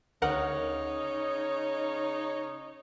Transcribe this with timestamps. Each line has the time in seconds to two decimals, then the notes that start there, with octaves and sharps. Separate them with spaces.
0.22 D2 C#3 D#4 A#4 C#5 F#5